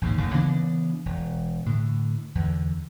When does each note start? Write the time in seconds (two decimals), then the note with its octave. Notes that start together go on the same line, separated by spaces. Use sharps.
0.02 A1 D#2 G#2 C#3
0.18 F#1 D#2 A2
0.34 C#3 E3 B3 D4
1.06 E1
1.66 A2 D3
2.35 E2 D3